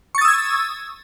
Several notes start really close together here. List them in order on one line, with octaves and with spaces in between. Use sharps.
C#6 A6 D#6 E6 G#6